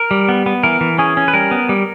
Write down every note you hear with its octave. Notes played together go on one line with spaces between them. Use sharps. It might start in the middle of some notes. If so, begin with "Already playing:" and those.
Already playing: A#4
G3
B3
B3
E3 A#4
E3
C#4 G#4
C#4
B4
G3 A#4
B3
G3